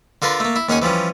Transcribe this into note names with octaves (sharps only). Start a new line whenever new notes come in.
D3 F4 A#4 B4
A3 A#3
E4
D#2 C#4 G#4 F#5 G#5
E3 F3 G3 C#4